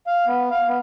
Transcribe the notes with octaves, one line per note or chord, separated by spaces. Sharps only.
F5
B3
F5
B3